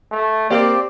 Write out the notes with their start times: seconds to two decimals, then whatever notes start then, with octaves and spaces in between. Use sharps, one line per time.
0.11 A3
0.50 A#3 C4 G4 D5